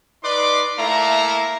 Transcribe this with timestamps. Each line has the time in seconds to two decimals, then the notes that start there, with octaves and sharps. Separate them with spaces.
0.23 D#4 B4 D5 C6 D6
0.78 A3 A#3 E4 F5 A#5